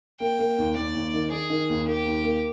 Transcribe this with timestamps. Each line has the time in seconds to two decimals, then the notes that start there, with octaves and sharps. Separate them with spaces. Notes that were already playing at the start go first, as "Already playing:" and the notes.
0.20 A#3 G5
0.39 A#3
0.58 D#2
0.76 D#2 D5
0.95 D#2
1.14 D#3
1.31 D#3 G#4
1.50 D#3
1.69 D#2
1.87 A#3 G4
2.05 D#2
2.24 A#3